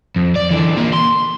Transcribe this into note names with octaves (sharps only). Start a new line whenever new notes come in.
F2
D5
D3 E3
F3 A#3
C6